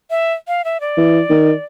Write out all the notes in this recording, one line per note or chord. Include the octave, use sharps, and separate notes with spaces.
E5
F5
E5
D5
E3
D#3